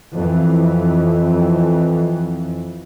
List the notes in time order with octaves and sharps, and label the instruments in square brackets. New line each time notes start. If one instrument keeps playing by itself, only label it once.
[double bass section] F2 E3